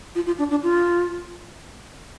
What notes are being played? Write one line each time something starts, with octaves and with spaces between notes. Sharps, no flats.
F4
F4
D4
D4
F4